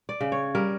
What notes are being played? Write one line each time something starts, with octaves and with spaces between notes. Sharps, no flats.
D5
C#3
C#5
G3 A#4